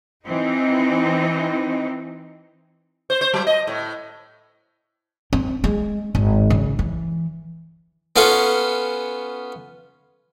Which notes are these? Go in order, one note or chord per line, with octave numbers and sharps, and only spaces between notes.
E3 C4 D#4
C5
C5
F#3
D#5
A2
C4
G#3
G#1
C#3
E3
B3 C#4 F4 A4